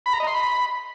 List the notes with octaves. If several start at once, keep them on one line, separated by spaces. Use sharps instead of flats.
B5
A#5
D#5
C6
B5